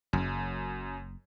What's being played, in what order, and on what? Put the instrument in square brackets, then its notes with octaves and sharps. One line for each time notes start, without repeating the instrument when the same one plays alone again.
[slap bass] F#1 [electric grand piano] F#2